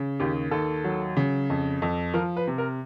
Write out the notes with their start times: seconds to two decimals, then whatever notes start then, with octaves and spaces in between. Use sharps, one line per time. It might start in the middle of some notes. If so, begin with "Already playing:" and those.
Already playing: C#3
0.20 D#2 G4
0.51 D#2 A4
0.84 F#3
1.17 C#3
1.50 F2
1.82 F2
2.14 F3 A#4
2.37 B4
2.47 C3
2.58 A#4